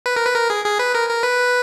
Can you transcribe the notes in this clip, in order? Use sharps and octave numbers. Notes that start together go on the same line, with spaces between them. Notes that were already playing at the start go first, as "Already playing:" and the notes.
B4
A#4
B4
A#4
G#4
G#4
B4
A#4
A#4
B4